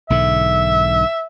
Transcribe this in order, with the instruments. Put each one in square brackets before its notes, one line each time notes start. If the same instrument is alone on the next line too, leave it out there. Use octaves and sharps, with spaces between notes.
[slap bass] B1 G#2 D3 [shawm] E5